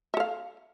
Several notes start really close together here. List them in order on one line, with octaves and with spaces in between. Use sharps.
E5 A4 F5